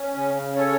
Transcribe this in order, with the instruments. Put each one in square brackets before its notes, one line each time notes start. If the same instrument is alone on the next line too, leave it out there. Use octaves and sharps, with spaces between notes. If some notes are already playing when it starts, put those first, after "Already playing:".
Already playing: [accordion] C#4
C#3
C#4 A4 C#5